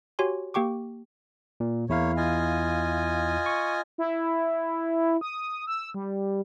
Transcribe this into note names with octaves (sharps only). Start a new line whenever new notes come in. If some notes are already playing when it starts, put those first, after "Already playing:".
F#4 G4 C#5 G#5 C6
A#3 G4 G5 C#6 D6
A#2
E2 A#3 E4 C#5 F5
F4 D#5 G#5
C#6
E4
D#6
E6
G3